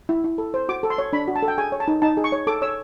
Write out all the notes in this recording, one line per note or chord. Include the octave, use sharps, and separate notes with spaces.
E4
E4
A4
C5
F#4 D6
A4
C6
C#5
D4 B5
F#4
A5
A4
G5
G#4 G#5
C#5
A5
D#4
D#4 A5
G#4
C#6
C#5
A4 D6
C#5 E6